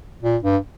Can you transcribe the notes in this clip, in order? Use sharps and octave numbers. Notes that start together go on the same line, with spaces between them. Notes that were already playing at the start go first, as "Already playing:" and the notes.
A#2
G2